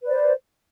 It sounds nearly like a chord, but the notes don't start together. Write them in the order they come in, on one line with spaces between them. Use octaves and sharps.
B4 D5 C5